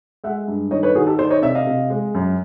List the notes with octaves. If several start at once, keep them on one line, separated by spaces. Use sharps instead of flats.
G#3 E5 F#5
G2
D#3 C#5 D#5
B4 C#5
D#3 F#4 G#4
G4 A4
D#3 C5 D5
C#5 D#5
C3 D5 E5
D#5 F5
C3
G#3
F#2